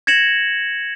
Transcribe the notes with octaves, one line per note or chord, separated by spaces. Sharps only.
G#6 A#6 C#7 E7 F#7